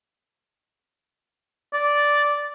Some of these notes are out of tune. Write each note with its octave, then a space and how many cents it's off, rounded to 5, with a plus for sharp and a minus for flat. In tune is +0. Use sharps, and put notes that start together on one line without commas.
D5 -5